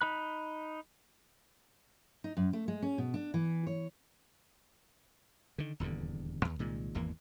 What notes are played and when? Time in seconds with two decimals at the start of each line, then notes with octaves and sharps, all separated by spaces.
0.01 D#4 B5 F#6
2.24 D#4
2.37 F#2
2.53 A3
2.68 G#3
2.82 C#4
2.98 B2
3.14 D4
3.34 E3
3.67 C#5
5.58 D3 D#3
5.80 D#1 E2 G2 D3
6.45 D#2
6.59 C2 A#2 D#3 G#3
6.95 G#1 E2 E3 A#3